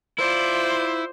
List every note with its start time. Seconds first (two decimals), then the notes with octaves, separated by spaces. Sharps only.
0.19 E4 F4 C5 D5